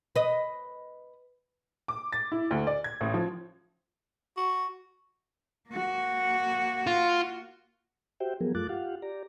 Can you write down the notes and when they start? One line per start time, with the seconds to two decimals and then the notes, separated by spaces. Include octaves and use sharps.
0.16 B4 D#5
1.88 D6
2.12 A6
2.32 E4
2.51 D2
2.67 D5
2.84 G#6
3.01 A1
3.14 F3
4.37 F#4
5.69 A#3 F#4
6.87 F4
8.20 F#4 G4 C5 E5 G5
8.40 F3 F#3 B3 G#4 A#4
8.55 F#2 A3 F4 D6 F#6 A6
8.69 F4 G4 F5 F#5
9.02 G4 D5 A#5